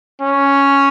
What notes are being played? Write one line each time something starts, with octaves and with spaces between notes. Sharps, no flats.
C#4